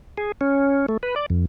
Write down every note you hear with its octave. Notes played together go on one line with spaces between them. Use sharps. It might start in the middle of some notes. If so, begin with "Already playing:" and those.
G#4
C#4
A3
B4
D5
F2